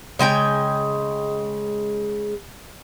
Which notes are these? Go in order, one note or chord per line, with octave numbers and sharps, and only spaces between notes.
C#3 G#3 G5 G#5